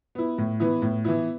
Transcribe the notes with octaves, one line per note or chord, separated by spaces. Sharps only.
B3 E4
A2
E3 B3 E4
A2
E3 B3 E4